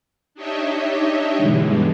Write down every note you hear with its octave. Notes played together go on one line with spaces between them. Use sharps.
D4 D#4 G4 C#5 D#5 E5
G2 B2 D3 E3 G3 G#3